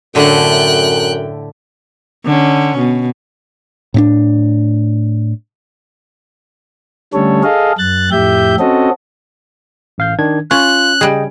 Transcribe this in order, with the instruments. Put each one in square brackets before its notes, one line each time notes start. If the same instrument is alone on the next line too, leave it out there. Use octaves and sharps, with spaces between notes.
[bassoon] F#2 [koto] A2 D3 A3 [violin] G5 F#6
[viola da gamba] D3 C#4
B2
[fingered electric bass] A2 C4 D4
[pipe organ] D3 G3 A3 C#4 A4 C#5
G#4 A4 D#5 F5
F#2 F#6 A6
F2 A2 G4 E5 G6
C4 C#4 F#4 A4 D#5
[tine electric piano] A1 F5 G6
D#3 D4 G#6
[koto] C#4 [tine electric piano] F4 [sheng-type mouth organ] F#6
[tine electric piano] C#3 D#5 G5 [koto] G3 G#4